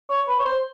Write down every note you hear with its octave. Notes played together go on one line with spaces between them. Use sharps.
C#5
B4
C#5
C5